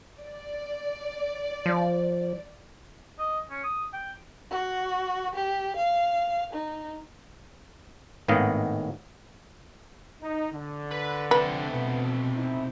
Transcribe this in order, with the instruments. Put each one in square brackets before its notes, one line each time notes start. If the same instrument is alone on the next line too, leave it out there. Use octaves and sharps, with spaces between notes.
[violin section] D5
[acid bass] F3
[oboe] D#5
C#4
D#6
G5
[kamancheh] F#4
G4
F5
D#4
[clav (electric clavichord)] G#1 A2 D#3 B3 D#5 F5
[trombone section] D#4
D3
[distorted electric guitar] B4 B5
[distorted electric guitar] C3 A4 [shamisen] B4
[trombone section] D2 B3 [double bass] B2
[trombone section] D#4 E4